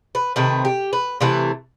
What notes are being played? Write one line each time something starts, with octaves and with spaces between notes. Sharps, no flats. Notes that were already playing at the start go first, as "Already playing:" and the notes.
B4
C3 D#3 A3 B4
G4
B4
C3 E3 A3 B4